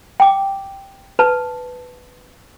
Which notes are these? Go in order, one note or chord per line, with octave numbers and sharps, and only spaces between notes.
G5 D6
B4 A5